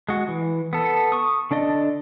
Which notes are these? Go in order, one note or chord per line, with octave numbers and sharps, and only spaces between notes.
G#3 F#4
E3
B3 A4
C#6 D#6
D3 D4 D5 D#5